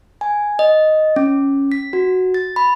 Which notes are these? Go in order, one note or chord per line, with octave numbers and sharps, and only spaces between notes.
G#5
D#5
C#4
B6
F#4
A6
B5